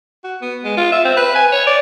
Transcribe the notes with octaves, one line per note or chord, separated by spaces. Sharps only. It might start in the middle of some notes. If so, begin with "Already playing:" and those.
F#4
B3
G#3
F4
E5
C4
B4
G#5
C#5
D5